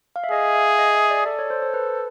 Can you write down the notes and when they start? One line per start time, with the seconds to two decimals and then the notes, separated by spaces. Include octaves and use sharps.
0.16 F5
0.24 E5
0.32 G#4 D#5
0.50 F5
0.55 E5
0.79 D#5
0.95 E5
1.10 D5
1.26 A4 D5
1.39 C#5
1.50 C5
1.62 C5
1.74 B4